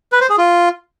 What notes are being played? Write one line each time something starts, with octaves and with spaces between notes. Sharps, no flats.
B4
C5
G#4
F4